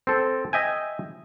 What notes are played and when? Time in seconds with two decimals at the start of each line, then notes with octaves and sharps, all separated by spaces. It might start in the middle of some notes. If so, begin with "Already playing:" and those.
0.07 C4 A4
0.53 D#5 E5 G5 G#5